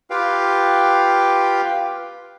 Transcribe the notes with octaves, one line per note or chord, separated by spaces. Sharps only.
F4 G4 B4 F5 G5